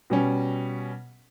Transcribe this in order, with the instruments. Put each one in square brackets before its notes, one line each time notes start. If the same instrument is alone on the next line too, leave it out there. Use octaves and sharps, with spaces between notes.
[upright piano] B2 G3 C#4